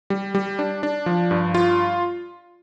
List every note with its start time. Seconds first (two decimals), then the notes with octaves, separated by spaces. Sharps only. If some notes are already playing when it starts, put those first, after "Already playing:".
0.10 G3
0.35 G3
0.59 D4
0.83 D4
1.06 F3
1.31 G2
1.54 F4